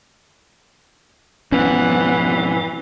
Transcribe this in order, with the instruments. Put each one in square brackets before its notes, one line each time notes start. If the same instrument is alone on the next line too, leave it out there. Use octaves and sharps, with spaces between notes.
[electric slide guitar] F2 G#2 B2 [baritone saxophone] E3 [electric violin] B3 F#5 [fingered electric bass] C#4